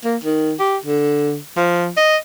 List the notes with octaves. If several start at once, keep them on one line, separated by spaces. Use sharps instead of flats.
A#3
D#3
G4
D3
F3
D#5